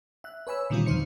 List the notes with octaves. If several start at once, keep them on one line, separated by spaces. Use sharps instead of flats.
E5 F#6
B4 C#5 G#5 B5 E6
A#2 D3 D#3 G3 C4 F4
E2 D3 F3 D#4 C5 C#7